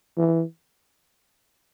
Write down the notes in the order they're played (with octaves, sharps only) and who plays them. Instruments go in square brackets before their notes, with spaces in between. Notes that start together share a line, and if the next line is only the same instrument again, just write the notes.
[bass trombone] E3